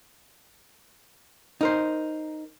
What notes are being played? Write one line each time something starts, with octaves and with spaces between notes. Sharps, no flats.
D#4 A#4 C5